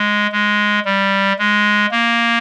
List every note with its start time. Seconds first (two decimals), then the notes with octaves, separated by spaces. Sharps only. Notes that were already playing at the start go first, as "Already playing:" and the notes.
Already playing: G#3
0.32 G#3
0.85 G3
1.39 G#3
1.91 A#3